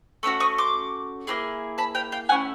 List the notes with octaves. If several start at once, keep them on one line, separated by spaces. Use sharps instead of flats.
A3 C#4 F#4 E6
C#6 D#6
C6 D6
A#3 C#4 E4 G#4
A5 B5
F5 G5
F5 G5
A3 C#4 E4 F#5 G#5